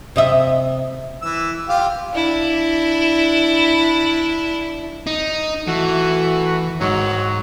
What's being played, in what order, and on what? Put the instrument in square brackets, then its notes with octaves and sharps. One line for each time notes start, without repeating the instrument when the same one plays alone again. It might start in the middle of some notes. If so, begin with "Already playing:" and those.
[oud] C3 D#5 E5
[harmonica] E3 E6
F4 G4 F5
[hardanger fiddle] D4 E4
[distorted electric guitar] D#4
[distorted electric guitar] E3 [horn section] A3 F#4
[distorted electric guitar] G#2 [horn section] D#3 F#3